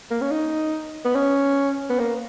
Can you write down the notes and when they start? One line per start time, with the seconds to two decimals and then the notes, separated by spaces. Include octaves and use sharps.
0.11 A#3
0.21 C#4
0.31 D#4
1.05 B3
1.15 C#4
1.90 B3
1.99 A#3